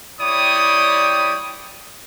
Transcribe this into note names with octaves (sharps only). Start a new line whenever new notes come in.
G3 E4 C#5 D5 G5 D#6